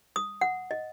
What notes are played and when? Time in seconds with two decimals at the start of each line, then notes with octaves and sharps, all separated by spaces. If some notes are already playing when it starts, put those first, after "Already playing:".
0.16 D#6
0.41 F#5
0.71 D#5